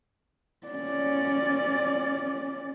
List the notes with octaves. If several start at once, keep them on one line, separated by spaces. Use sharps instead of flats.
C#4 D5